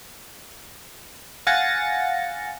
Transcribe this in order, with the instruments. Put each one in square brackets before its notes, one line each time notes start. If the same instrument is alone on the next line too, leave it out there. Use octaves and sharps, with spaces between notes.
[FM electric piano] F5 F#5 G#5 A6 A#6 C#7